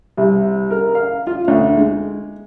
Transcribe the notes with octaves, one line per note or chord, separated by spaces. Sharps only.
C2
A#4
F5
F4
D2
G#3